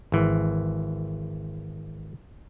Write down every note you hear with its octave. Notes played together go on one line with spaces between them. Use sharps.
G#1 E3